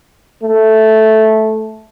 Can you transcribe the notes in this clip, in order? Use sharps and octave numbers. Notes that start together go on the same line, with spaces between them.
A3